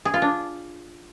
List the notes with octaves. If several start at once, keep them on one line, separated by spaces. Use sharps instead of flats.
G#4
F4
D4